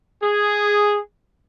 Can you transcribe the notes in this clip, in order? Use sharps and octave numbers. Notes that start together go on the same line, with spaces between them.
G#4